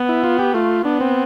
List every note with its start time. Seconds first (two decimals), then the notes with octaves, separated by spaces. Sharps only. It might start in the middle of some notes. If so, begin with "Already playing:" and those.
Already playing: B3
0.09 E4
0.24 F4
0.39 G4
0.54 A3 F4
0.85 B3 D4
1.00 C4